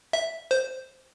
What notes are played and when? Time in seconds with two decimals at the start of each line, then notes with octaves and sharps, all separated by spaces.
0.13 E5
0.51 C5